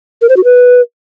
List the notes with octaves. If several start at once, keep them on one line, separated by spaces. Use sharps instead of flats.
A#4
C5
F#4
B4